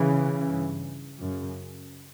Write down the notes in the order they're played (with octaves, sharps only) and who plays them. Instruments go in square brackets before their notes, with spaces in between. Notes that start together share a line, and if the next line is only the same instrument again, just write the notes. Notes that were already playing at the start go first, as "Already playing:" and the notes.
Already playing: [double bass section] C#3 E3
G2
F#2 C#3